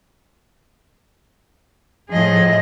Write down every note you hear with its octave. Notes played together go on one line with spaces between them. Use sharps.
A2 F3 G#4 D#5